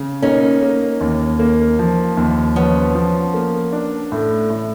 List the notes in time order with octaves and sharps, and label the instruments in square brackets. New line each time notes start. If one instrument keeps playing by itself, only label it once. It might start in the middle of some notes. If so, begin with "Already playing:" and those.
Already playing: [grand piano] C#3
[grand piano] A#3 [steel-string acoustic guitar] C#4 D#4
[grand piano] A#3
D#2
A#3
F3
D#2
[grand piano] F3 [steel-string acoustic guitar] B3 C#4
[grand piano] F3
A#3
D4
A2
A2